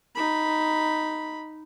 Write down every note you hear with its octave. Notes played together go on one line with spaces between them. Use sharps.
D#4 B5